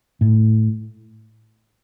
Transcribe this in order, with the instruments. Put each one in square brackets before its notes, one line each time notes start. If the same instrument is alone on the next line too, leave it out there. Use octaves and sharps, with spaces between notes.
[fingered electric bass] A2